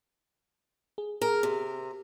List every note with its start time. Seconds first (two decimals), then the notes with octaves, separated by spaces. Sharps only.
0.98 G#4
1.22 G#4 A#4
1.43 C3